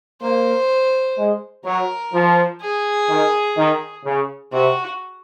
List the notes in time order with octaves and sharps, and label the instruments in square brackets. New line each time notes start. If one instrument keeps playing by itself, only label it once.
[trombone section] A#3 [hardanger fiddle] C5
[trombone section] G#3
[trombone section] F#3 [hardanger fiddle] A#4
[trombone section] F3
[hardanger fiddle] G#4
[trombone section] D#3
D#3
C#3
[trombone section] C3 [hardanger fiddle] F#4